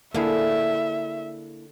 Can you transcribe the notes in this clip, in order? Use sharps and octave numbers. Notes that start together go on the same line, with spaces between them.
D3 A#3 E4 G#4 E5